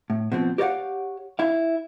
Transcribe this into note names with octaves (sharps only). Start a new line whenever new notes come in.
A2
B2 F3 C4
G4 A#4 C#5 D5 F5 F#5
E4 F5